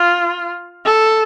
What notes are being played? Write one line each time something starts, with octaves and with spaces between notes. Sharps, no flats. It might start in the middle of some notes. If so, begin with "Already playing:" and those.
Already playing: F4
A4